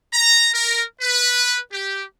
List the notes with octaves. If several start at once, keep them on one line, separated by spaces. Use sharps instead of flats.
A#5
A#4
B4
G4